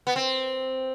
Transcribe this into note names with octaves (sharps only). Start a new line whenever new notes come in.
B3
C4